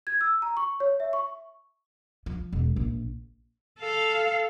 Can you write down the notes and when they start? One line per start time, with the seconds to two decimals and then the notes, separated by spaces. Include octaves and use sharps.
0.07 G#6
0.21 E6
0.42 A#5
0.57 C#6
0.80 C#5
1.00 E5
1.13 C#6
2.26 F3
2.52 E1
2.76 A#1
3.79 A4 F5